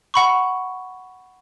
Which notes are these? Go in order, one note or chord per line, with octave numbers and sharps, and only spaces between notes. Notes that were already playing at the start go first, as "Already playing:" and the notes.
F#5 B5 C#6